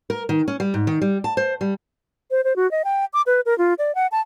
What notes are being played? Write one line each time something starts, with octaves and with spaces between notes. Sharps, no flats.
A#4
D#3
C#4
G3
G#2
D#3
G3
A5
C5
G3
C5
C5
F#4
D#5
G5
D6
B4
A#4
F4
D5
F#5
A5